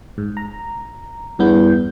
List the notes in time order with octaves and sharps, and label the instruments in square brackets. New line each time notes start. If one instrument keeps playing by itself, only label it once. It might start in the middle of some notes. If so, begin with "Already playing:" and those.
[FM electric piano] G#2
A#5
[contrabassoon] E2 [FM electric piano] G2 B3 G6